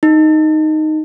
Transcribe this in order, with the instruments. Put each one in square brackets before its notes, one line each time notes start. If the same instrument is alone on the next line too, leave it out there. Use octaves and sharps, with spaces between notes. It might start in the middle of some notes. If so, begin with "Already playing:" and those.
[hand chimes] D#4